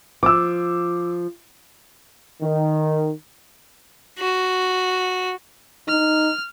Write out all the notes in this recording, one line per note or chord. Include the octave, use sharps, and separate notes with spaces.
F3 D6 E6
D#3
F#4
D#4 F6